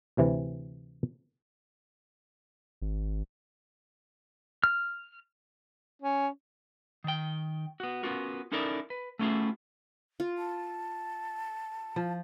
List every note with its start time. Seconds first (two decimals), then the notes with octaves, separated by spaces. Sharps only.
0.17 D2 C3 E3
2.82 G#1
4.64 F6
6.02 C#4
7.04 D#3 G5
7.80 B3 F#4
8.03 B3 C#4 F4 F#4 A#4
8.52 C#4 D#4 E4 A4 A#4 D5
8.90 B4
9.19 A3 B3 C#4 E4 F4 G#4
10.20 F4
10.38 A5
11.96 F3